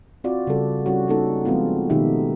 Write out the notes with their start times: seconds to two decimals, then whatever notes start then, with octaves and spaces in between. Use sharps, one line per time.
0.24 C4 F4 F#4 D5
0.47 C#3 G3 A4
0.86 G3 C#4 E4 F#4
1.08 A#3 B3 C#4 D#4 A4
1.45 F3 G#3 B3 C4 F4
1.90 B2 D#3 A3 D#4 G4 E5